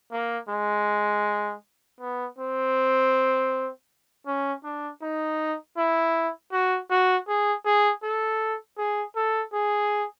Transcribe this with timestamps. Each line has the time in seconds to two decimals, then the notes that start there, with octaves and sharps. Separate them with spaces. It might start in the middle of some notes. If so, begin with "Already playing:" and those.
0.12 A#3
0.49 G#3
2.00 B3
2.38 C4
4.27 C#4
4.64 D4
5.02 D#4
5.77 E4
6.52 F#4
6.90 F#4
7.28 G#4
7.66 G#4
8.03 A4
8.78 G#4
9.16 A4
9.53 G#4